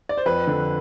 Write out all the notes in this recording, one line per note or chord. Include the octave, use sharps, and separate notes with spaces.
D5
C5
F2 B4
D3